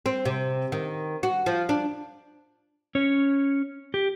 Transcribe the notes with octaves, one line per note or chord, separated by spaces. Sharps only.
C4
C3
D#3
F#4
F3
D4
C#4 C#5
G4